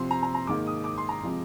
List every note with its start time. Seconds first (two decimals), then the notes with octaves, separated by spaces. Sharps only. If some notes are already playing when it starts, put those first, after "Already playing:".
Already playing: C3 F3 C4 C6
0.11 A#5
0.23 A#5
0.35 A#5
0.47 G#2 D#3 A#3 D6
0.67 D#6
0.84 D6
0.98 C6
1.09 A#5
1.23 C3 F3 G#3 C4